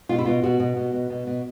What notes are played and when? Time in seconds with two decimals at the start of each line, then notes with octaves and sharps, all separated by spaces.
0.09 B2 F4
0.18 E4
0.25 B2 F4
0.43 B2 F#4
0.60 B2
0.77 B2
0.93 B2
1.10 B2
1.27 B2